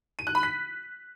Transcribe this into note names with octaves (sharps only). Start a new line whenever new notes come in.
D#7
F#6
B5
B6